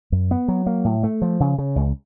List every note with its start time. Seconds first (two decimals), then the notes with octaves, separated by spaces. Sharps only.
0.12 F#2
0.31 B3
0.48 F#3
0.66 A#3
0.85 A2
1.03 A3
1.22 F3
1.40 C#3
1.58 C#3
1.76 C#2